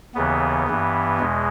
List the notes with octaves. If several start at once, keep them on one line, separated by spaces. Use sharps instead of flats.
D#2 C#3 E3 B3
G2 E3
E2 B2 G#3